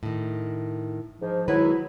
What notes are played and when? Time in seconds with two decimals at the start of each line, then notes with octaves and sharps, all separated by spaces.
0.03 A2 D#3
1.21 G#2 F3
1.48 D#3 F#3 G#3 E4 B4